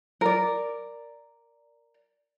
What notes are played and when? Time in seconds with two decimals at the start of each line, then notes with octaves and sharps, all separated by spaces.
0.21 A#4 D5